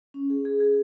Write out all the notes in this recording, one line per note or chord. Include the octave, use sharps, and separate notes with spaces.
C#4
G#4
G#4
G#4